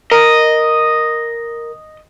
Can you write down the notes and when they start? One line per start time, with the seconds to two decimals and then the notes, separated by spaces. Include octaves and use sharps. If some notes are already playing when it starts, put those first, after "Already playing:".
0.12 A#4 D#5